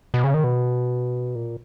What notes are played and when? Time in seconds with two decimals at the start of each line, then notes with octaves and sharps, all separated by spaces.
0.14 B2
0.24 C#3
0.34 D#3
0.44 B2
1.35 A#2